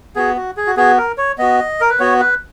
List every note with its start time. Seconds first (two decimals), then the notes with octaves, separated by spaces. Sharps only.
0.16 B3 F#4 G#4
0.37 F#4
0.57 G#4
0.67 F#4
0.77 B3 F#4 G#4
0.98 A#4
1.18 C#5
1.38 B3 F#4 D#5
1.81 A#4
1.90 B4
2.00 B3 F#4 C#5
2.20 B4